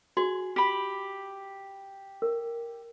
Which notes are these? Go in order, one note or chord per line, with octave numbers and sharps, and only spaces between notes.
F#4 G#4
G4 B5
A#4